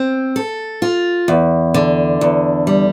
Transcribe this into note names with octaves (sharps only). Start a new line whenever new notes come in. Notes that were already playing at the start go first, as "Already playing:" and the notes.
Already playing: C4
A4
F4
E2
D3
E2
G3